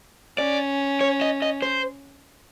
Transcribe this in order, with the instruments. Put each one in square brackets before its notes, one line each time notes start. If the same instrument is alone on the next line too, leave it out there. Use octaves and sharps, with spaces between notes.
[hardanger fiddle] C#4 [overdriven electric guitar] D5
[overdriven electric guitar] C#5
D#5
D#5
C5